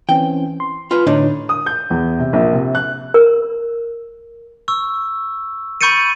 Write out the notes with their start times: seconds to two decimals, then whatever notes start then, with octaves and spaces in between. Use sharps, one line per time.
0.09 E3 C4 C#4 G5
0.60 C6
0.91 F4 B4
1.07 A2 D3 D4 D#4 C#5
1.49 D#6
1.66 G6
1.90 E2
2.19 C3
2.33 A#1
2.53 C3
2.75 F#6
3.14 A#4
4.68 C#6 E6
5.81 B5 C#6 G6 A6 C#7 D#7